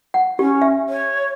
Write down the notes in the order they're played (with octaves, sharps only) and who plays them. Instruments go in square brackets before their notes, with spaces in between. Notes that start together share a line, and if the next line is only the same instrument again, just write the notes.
[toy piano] F#5
[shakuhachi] C#4 [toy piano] G4
[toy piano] E5
[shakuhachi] C#5